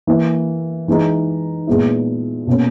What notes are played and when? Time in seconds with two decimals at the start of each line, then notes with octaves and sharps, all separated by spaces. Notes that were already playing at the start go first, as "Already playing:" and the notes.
0.07 E3 A#3 E4
0.88 E3 G#3 D#4
1.67 A#2 G#3 B3 E4
2.47 B2 A#3 C#4